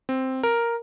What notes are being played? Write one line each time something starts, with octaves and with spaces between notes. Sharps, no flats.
C4
A#4